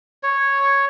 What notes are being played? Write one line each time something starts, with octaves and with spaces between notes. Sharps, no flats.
C#5